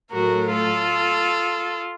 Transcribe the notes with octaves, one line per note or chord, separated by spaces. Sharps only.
A2 F#3 A3 F#4 A#4
F4 A4